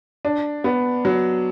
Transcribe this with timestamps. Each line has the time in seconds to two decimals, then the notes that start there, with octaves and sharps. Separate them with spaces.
0.25 D4
0.64 B3
1.05 F#3